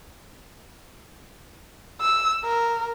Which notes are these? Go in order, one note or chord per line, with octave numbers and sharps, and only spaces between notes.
E6
A#4